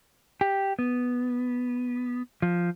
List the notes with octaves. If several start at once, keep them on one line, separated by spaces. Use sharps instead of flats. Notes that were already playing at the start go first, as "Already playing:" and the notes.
G4
B3
F3